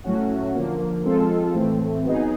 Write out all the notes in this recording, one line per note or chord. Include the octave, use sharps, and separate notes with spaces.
A2 F#3 A3 C#4 F#4
D3 F3 A#3
F3 G#3 C4 F4 A4
A2 E3 A3 C4
F#3 B3 D#4 G#4